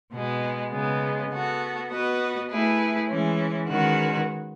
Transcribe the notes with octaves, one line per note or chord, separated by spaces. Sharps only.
B2 G#3 B3
C#3 G#3 B3
B3 F#4 A4
B3 F#4 B4 D#5
A3 E4 G#4 B4
E3 G#3 C#4
D#3 G#3 C#4 F#4 B4